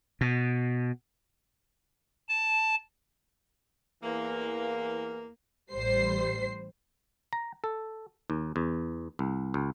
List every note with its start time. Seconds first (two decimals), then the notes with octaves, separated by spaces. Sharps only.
0.21 B2
2.29 A5
4.02 E2 E3 A#3
5.73 A1 G3 C5 C7
7.33 A#5
7.64 A4
8.30 D#2
8.56 E2
9.19 C2
9.54 C#2